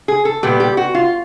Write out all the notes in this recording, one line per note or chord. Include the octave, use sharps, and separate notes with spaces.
G#4
A4
A#2 G3 B3 G4
G4
F#4
F4